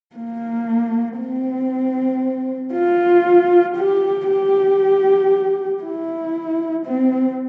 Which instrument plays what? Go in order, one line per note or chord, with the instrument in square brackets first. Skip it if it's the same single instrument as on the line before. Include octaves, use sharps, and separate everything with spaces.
[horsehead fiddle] A#3
C4
F4
G4
G4
E4
C4